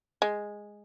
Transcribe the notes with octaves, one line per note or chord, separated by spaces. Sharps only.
G#3